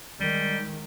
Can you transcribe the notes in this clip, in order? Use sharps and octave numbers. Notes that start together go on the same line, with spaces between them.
D#3 G3 G#3